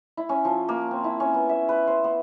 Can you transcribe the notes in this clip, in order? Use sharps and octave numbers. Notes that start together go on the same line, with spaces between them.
E4
C#4
F3
A#3
C4
E4
C#4
B3
E5
B4
C5
B3